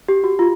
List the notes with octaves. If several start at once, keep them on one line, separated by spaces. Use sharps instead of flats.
G4
F#4
F4